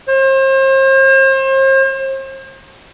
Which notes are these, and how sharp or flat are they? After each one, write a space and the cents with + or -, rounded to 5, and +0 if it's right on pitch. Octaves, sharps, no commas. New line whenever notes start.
C5 +40